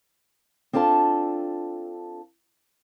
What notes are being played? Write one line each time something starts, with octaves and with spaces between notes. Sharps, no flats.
C4 D4 F4 A4 A5